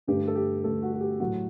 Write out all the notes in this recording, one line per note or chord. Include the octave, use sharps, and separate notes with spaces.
G2 D3 A3 G4
A4
G4
G2 D3 A3 A4
F#4
F#4
G4
A2 F#3 A3 F#4